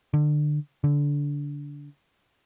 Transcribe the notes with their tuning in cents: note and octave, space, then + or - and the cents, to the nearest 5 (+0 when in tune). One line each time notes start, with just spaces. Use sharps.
D3 +25
D3 -20